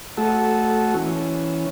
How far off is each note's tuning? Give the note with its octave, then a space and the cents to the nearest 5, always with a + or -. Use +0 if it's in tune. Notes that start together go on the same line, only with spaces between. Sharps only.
A3 +0 F#4 +0 A4 -15
E3 +0 C#4 +0